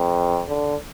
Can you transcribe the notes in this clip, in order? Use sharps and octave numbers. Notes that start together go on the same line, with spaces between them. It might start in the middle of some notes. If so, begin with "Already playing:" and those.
Already playing: F2
D3